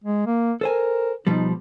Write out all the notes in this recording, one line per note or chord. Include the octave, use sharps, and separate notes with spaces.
G#3
A#3
A4 A#4 C5 G#5
B2 F3 G3 D#4